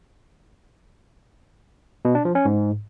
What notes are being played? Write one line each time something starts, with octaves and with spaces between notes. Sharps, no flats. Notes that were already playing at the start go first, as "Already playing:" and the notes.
B2
D4
F3
C#4
G#2